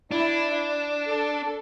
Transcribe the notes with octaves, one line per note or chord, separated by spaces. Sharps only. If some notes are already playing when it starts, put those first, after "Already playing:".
D4 E4
A4